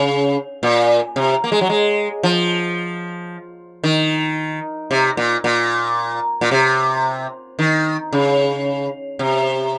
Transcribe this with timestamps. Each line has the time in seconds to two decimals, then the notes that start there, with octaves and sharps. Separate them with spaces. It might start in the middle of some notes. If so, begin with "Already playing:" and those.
Already playing: C#3
0.63 A#2
1.16 C3
1.44 A#3
1.52 G#3
1.61 F#3
1.70 G#3
2.23 F3
3.84 D#3
4.91 C3
5.17 A#2
5.44 A#2
6.41 A#2
6.51 C3
7.59 D#3
8.13 C#3
9.19 C3